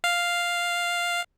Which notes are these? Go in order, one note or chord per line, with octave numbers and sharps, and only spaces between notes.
F5